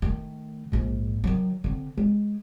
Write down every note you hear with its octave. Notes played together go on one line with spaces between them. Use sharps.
D#3 A3
A#1 G#2
D#3 F#3
D3 C4
G#3